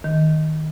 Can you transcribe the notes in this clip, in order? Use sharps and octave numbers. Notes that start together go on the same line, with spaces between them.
D#3